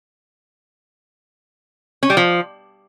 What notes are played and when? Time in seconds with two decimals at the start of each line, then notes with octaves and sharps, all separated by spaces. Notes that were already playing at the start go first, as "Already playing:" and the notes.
2.03 C#4
2.10 G3
2.17 F3